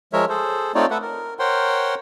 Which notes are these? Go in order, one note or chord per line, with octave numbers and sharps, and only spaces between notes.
F3 G#3 A#4 C#5 E5
G#4 A4 C5
A3 C4 D#4 F4 C#5 D5
A4 B4 E5 F#5
A#4
A#4 C5 C#5 F#5 G5 C6